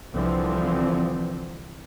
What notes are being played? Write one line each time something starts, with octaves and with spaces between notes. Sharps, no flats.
C2 D3 E3 F3 C4